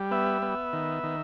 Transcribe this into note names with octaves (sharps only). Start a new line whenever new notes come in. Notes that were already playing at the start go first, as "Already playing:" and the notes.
Already playing: G3
B3 E5
B3
D#3
D#3